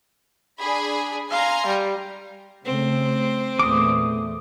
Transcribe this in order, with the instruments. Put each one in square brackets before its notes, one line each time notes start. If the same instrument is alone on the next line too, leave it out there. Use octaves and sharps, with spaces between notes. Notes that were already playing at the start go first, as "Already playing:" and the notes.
[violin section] D4 G#4 B5
[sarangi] F5 [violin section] G#5 A#5 C6
[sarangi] G3
[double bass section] C#3 A3 [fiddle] C4
[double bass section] E2 A#2 A3 [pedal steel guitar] D6 D#6